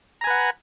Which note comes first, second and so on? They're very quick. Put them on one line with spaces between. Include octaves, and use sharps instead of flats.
A#5 G#5 B4 F#5